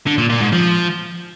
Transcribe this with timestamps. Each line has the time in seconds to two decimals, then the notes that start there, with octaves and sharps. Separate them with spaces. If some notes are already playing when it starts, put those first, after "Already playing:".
0.07 D3
0.18 A#2
0.30 A#2
0.41 G#2
0.52 F3